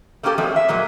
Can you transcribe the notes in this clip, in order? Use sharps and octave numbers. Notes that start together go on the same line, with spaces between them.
A3 A#3 C#4 F#4 G4 A4
F3 F#3 G#3 A3 C4
E5
A#2 F#3 G#3 A#3